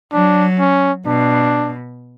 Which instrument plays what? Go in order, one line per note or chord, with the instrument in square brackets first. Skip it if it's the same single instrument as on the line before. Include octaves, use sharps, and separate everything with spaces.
[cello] F#3 [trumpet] D4
[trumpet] C#4
[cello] B2 [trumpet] D4